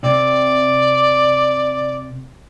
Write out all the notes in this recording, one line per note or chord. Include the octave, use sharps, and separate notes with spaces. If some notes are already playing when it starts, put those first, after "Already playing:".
C3 C4 D5